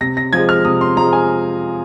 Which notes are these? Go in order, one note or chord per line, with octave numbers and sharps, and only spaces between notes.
C3 A#6
A#6
F3 G#3 G#6
F6
C3 D#6
C6
F3 G#3 A#5
G#5